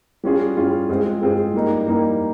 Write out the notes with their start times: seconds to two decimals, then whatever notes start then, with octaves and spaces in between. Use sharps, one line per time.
0.24 G3 C#4 F4 G#4
0.57 G3 C#4 F4 G#4
0.89 G#3 C4 F4 G#4
1.21 G#3 C4 F4 G#4
1.54 G3 A#3 D#4
1.87 G3 A#3 D#4